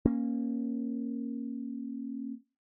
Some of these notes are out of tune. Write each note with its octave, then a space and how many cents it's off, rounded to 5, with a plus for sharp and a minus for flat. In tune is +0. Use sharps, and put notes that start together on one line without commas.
A#3 +0 C#4 -20